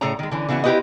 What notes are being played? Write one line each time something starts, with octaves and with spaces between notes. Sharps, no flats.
A2 C#3 G#4 A4 C#5 A#5
D#3 G#3
D3 E3 C#4
C#3 E3 B3 E4 F#4
E4 F4 G4 B4 C5 D#5